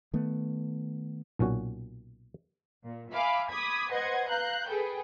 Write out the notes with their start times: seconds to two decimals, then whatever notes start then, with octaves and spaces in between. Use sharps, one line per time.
0.13 D#3 A3 B3
1.39 B1 A#2 C#4 F#4
2.84 A#2
3.12 E5 F5 G#5 B5 D6
3.49 B5 D6 D#6 G#6 B6
3.90 B4 C5 D#5 F#5 G#6
4.29 F5 A#5 F#6 G6
4.67 G#4 A4 B4 G5